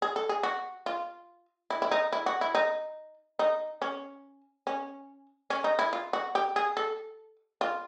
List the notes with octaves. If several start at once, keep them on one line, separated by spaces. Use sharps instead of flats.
G#4
A4
G#4
F#4
F4
E4
E4
D#4
E4
F#4
E4
D#4
D#4
C#4
C#4
C#4
D#4
E4
F4
F#4
G4
G#4
A4
F4